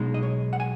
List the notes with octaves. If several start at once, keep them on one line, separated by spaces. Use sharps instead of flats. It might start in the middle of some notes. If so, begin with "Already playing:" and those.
Already playing: B1 B2 G#3 D#4
D#5
C#5
F#5
G#5